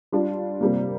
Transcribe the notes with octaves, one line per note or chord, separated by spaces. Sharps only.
G3 D4 F4
C3 G3 A#3